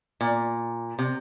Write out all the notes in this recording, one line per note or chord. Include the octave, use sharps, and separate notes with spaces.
A#2
C3